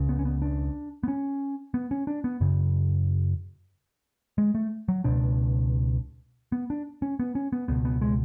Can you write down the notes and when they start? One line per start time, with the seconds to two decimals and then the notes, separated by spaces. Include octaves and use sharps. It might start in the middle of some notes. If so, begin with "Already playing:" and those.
Already playing: C#2 C#3
0.09 B3
0.19 C#4
0.25 B3
0.42 D4
1.03 B3
1.08 C#4
1.74 B3
1.91 C#4
2.07 D4
2.24 B3
2.41 F#2 C#3
4.38 G#3
4.55 A3
4.88 F#3
5.04 C#2 B2 D4
6.52 B3
6.70 D4
7.02 C#4
7.19 B3
7.35 C#4
7.52 B3
7.68 C#2 B2 B3
7.85 B3
8.01 G#3